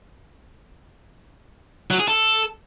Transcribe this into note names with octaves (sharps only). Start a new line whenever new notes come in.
F#3
G#4
A4